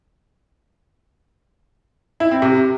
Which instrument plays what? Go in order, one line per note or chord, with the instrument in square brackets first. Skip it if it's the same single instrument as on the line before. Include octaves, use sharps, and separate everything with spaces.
[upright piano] E4
C4
C3